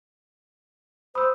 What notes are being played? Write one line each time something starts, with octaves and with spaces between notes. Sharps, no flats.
C5 B5 D#6 E6